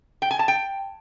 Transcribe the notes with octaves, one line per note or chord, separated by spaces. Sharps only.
G5
G#5
A5
G5